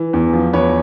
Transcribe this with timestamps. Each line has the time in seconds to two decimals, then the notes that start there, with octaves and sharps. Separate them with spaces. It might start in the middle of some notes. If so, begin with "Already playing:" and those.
Already playing: E3
0.13 E2
0.33 F3
0.53 E2 B4 C#5